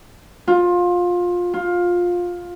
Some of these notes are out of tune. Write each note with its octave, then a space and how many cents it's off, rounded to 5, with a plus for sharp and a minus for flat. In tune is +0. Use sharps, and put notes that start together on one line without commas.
F4 +20
F4 +15